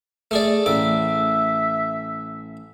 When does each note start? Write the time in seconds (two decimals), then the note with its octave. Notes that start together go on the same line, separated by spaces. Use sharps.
0.31 A3 G#4 D5
0.66 A1 E5 D6